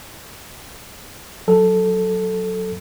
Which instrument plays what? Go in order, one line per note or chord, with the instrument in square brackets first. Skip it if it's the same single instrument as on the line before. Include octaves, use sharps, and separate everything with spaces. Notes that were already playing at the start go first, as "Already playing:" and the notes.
[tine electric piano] F#3 A4